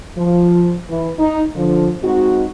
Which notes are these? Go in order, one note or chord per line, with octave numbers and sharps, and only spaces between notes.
F3
E3
D#4
D3 F3
G#3 C4 D#4 F#4